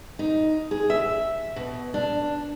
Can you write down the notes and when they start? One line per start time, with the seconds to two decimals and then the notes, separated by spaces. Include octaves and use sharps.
0.19 D#4
0.71 G#4
0.90 E5
1.56 B2
1.94 D4